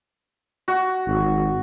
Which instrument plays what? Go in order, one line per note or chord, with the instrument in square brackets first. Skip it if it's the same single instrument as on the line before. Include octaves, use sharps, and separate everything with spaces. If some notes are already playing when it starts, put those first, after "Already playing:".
[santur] F#4
[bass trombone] G#1